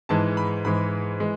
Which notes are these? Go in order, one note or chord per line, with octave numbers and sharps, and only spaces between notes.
G#2 E3 G#3 A5
B5
G#2 E3 G#3 B5
E3 G#3